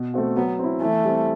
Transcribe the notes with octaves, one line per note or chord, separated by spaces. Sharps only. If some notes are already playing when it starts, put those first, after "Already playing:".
Already playing: B2
A3 C4 F#4
F#3 B3
C4 E4
E3 A3
G3 C4